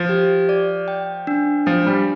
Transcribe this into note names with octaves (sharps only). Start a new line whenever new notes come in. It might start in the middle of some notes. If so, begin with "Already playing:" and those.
Already playing: F3
G4
D5
G5
D4
F3 F4
G3